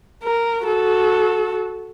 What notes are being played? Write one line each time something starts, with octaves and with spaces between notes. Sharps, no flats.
A#4
F#4 A4